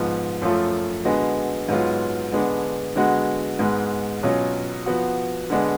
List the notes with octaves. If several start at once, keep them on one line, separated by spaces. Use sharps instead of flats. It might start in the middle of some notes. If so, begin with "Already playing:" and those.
Already playing: G#2 F3 B3
F#2 F3 A3 F4
D3 G#3 B3 F#4
G#2 F#3 B3 F4
D3 G#3 B3 D4
D3 G#3 B3 F#4
G#2 G#3 B3
B2 F#3 C#4 F4
F3 B3 F#4
D3 G#3 B3 D4